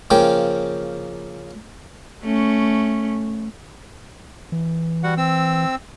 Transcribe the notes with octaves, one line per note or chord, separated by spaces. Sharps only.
C#3 F3 A#3 G5
A3 C#4
E3
G3 F#4 F#5
C4 E6